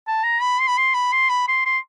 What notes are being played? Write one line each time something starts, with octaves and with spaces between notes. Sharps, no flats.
A5
A#5
B5
C6
B5
C6
B5
C6
B5
C6
C6